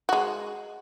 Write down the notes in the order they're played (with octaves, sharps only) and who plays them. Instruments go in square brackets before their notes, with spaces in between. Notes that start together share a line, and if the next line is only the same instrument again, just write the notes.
[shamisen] G#3 F#4